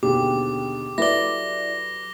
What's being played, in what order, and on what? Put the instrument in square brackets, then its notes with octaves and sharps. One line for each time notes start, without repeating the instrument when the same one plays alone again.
[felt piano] D#2 B2 D3 [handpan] G4 G#4 [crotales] D6
[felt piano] F#3 A4 B4 [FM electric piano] E4 D5 [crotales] A#6 G7